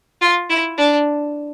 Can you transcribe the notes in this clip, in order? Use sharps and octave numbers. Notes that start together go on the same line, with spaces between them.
F4
E4
D4